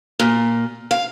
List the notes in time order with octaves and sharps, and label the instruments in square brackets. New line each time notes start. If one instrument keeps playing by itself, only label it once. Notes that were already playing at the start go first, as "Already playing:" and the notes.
[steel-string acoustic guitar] A#2
F5